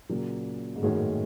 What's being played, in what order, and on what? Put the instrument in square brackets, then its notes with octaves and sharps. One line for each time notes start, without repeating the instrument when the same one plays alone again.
[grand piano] A#2 [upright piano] C#3 F#3 A#3
[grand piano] G#2
[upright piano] F#2 D#3 G#3 C#4 F#4 [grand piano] A2